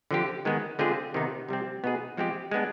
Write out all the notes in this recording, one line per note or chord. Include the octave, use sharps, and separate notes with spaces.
D3 F3 C4 G4
D#3 G#3 B3
D3 G#3 C4 F4 G#4
C3 D#3 B3 D#4
C3 G3 C4
B2 B3 D#4 G#4
F3 G#3 C4 G4
G#3 B3 D4